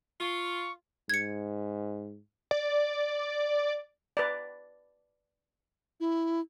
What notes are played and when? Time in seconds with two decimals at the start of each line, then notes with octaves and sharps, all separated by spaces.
0.20 F4 C#6
1.10 G#2 G#6 C#7
2.51 D5
4.17 B4 D5
6.00 E4